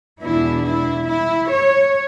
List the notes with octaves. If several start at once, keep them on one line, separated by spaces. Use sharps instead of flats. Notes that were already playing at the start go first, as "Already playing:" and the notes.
E2 B2 G#3 B3 D4 E4
E4
E4
C#5